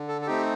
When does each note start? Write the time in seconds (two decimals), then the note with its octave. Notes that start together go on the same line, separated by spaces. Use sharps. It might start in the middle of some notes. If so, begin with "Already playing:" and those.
Already playing: D3
0.08 A4
0.21 A4
0.27 A3 C4 D#4 G4